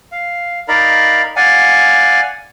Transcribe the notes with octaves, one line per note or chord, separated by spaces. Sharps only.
F5
D#4 A#4 D5 F5 A#5 B5
D5 F5 F#5 G#5